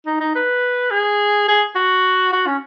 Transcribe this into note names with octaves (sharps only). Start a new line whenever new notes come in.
D#4
D#4
B4
G#4
G#4
F#4
F#4
C#4